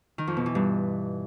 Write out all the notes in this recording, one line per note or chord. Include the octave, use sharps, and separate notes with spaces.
D#3
F2
B2
E3
G2